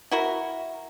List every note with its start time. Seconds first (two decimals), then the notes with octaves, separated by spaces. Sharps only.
0.11 E4 F#4 A#4